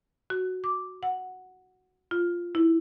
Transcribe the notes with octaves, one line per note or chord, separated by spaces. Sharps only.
F#4
D6
F#5
F4
E4